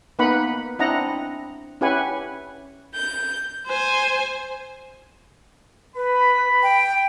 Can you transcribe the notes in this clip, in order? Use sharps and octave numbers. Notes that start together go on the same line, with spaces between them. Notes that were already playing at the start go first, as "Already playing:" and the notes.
A#3 B3 D#4 B4 F#5 B5
C4 D4 E4 D#5 F#5 A#5
C#4 E4 G4 B4 F#5 G#5
G6
C5 G#5
B4 B5
G5